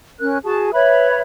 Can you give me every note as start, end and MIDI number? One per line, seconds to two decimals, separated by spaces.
0.20 0.38 61
0.20 0.38 70
0.20 0.38 90
0.44 0.70 66
0.44 0.70 68
0.44 0.70 81
0.73 1.20 71
0.73 1.20 73
0.73 1.20 76
0.73 1.20 83